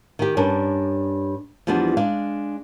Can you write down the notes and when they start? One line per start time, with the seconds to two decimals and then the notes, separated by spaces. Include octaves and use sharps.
0.19 D#3 G4
0.37 G2 C#4 D4 A#4
1.67 E2 F3 G3 B3 D4
1.97 G#3 D4 F5